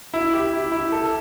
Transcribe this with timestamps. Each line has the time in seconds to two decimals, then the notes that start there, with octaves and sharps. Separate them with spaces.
0.14 E4
0.33 G4
0.53 E4
0.72 E4
0.92 A4